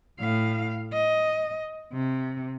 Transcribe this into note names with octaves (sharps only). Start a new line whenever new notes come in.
A2 F5
D#5
C3